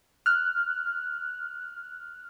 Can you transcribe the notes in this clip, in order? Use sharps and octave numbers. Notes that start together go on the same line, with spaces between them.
F6 F#6